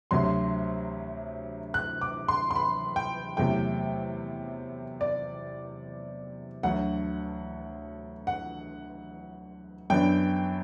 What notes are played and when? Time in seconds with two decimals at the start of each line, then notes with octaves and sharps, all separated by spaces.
0.11 D2 C3 F#3 C6
1.74 F#6
2.01 D6
2.28 C6
2.51 C6
2.56 B5
2.96 G5
3.37 E2 C3 F#3 A3 G5
5.01 D5
6.63 D2 D3 F#3 F#5
8.27 F#5
9.90 F#2 D3 F#3 B3 D4 G5